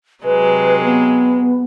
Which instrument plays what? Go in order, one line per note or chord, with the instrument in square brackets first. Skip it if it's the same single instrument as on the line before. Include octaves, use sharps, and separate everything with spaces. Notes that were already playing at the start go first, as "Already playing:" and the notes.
[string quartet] C3 F#3 G#3 [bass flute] B4
[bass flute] B3